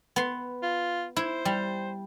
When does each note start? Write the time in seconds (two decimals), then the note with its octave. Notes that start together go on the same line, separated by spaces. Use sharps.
0.16 B3 C6
0.63 F4
1.17 E4 C5
1.45 G3